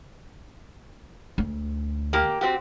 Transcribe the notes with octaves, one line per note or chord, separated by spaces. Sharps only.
D2
A#3 G4
C4 F#4 G4